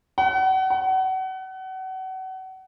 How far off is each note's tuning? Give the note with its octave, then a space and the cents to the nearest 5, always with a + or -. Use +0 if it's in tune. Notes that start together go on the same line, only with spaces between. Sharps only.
F#5 +35
F#5 +30